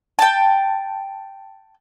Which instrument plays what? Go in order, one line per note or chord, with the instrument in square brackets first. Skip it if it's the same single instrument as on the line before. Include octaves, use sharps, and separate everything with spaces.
[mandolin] G5 A5